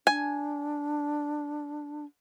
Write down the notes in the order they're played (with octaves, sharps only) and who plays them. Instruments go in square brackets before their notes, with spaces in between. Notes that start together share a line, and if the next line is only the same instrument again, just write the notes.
[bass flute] D4 [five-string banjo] G#5